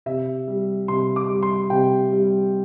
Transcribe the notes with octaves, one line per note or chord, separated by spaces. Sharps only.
C3 E5
G3
C3 C6
D6
G3
C6
C3 G5
G3